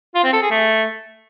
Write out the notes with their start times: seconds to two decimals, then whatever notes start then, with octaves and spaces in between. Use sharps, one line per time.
0.15 F4
0.24 C4
0.33 A4
0.42 G#4
0.51 A3